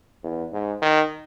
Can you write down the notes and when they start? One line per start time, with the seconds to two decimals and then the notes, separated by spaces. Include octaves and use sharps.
0.23 E2
0.52 G#2
0.82 D#3